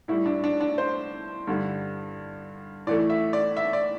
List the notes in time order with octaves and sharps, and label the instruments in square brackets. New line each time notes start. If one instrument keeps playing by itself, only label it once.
[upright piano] A2 G3 E4
D4
D4
D4
C5
G2 D3 G3
A2 E3 A3 D5
E5
D5
E5
D5